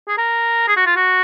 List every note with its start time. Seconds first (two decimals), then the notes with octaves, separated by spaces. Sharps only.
0.08 G#4
0.18 A#4
0.68 G#4
0.76 F#4
0.86 F4
0.96 F#4